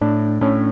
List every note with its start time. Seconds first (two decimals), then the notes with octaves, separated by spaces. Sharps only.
0.01 A2 D4
0.41 A2 C#4